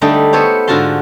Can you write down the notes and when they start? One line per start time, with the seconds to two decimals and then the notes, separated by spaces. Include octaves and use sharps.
0.01 D3 G3 A3 D4 D#4
0.33 B3 A4 C5 C#5
0.68 G#2 D3 F4 F#4 A5 C6